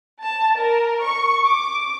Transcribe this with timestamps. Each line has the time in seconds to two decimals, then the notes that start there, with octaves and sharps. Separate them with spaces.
0.22 A5
0.58 A#4
1.02 C#6
1.46 D6